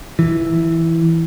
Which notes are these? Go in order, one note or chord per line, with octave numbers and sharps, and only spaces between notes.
E3